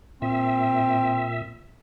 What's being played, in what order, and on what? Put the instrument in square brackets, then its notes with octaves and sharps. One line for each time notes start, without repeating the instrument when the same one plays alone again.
[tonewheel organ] A#2 E5 [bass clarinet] C4